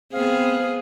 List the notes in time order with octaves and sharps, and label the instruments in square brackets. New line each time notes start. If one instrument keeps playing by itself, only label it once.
[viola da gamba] B3 G#4 [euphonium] C4 [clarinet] F5